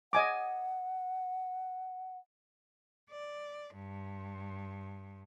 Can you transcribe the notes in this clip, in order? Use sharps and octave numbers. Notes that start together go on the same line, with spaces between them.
D#5 F#5 G#5 D6
D5
G2